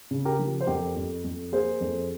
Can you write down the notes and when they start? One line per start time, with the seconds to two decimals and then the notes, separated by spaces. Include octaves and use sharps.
0.11 C#3
0.25 G4 A#4
0.39 F3
0.61 C5
0.67 F2 G4 A#4
0.97 F2
1.24 F2
1.52 A#3 G#4 C5
1.81 F2